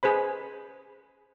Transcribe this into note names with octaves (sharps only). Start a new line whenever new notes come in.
G#4 B4 C5 B5